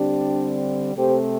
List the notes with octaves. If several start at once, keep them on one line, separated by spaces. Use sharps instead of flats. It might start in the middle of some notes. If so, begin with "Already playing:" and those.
Already playing: D3 G3 C4 D4 G4
C3 A3 C4 G4 C5